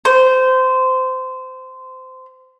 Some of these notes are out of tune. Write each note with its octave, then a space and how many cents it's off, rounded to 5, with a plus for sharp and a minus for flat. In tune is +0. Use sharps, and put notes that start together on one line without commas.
C5 -20